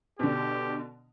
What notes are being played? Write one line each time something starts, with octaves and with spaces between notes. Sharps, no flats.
B2 D3 G4